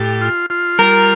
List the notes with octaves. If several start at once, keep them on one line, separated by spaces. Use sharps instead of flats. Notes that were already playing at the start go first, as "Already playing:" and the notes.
Already playing: A2 G4
F4
F4
G3 A#4